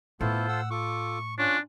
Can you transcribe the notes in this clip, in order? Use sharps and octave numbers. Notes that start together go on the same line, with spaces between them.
A2 A3 B3 E4 F4 A4 C5
F#5 E6
F4 A4 C#6 D6
C#4 D4 F4 C#5 F#6